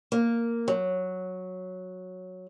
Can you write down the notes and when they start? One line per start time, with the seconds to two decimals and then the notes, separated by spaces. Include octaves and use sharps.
0.12 A#3
0.68 F#3